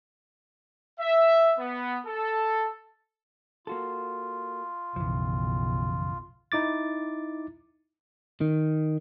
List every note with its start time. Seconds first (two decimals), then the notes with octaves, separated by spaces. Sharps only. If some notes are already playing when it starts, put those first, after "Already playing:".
1.00 E5
1.59 B3
2.06 A4
3.67 A#3 F4 F#4 A4
4.96 B1 F#2 C#3 E3 F3
6.52 D#4 E4 D6 A6
8.41 D#3